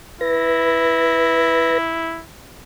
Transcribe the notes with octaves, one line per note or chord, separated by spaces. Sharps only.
E4 B4 A#6